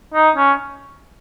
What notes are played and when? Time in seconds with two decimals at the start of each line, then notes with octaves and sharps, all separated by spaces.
0.14 D#4
0.36 C#4